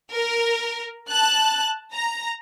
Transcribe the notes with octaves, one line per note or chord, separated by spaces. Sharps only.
A#4
A5 F#6
A#5